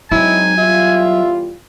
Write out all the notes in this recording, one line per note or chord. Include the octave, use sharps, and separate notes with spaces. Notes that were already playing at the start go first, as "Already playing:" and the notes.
F#3 G#3 C4 D#4 E4 G#5
E2 G3 F4 E5